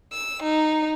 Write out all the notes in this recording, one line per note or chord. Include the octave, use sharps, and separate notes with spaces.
E6
D#4